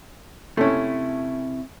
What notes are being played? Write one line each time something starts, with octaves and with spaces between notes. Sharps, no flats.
C3 A3 C#4 E4